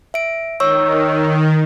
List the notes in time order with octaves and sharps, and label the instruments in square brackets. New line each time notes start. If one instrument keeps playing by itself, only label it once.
[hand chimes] E5 D7
[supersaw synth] D#3 [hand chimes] C#5 C#6 E6